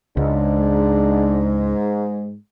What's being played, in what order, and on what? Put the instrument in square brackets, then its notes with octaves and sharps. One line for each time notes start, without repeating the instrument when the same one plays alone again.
[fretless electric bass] C#2 [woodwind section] G#2 [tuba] G#3 [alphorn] D4